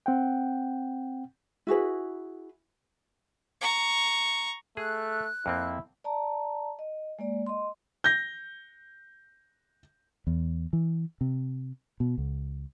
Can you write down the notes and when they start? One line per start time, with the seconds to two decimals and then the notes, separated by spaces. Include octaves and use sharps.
0.06 C4 F#5 G5
1.67 E4 F#4 G#4 B4
3.61 A#5 C#6
4.77 A3 G#4 F#6
5.46 F2 A#3 C4 E4
6.04 D5 A5 A#5
6.79 D#5
7.19 G#3 A#3 D5
7.46 D#5 C6
8.04 G6 A#6
10.27 E2
10.73 E3
11.21 C3
12.00 B2
12.18 C#2